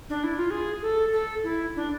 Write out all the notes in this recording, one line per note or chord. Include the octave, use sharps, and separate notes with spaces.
D4
E4
F4
G#4
A4
A4
E4
D4